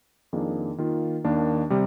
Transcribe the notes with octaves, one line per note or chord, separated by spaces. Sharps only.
F2 D#3 A#3 D4 G#4
D#3 A#3 F4
D#2 D#3 A#3 D4
C3 G3